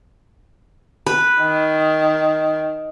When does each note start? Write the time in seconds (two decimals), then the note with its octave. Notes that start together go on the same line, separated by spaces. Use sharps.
1.06 B4
1.41 D#3